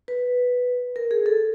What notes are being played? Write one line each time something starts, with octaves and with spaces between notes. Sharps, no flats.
B4
A#4
G#4
A4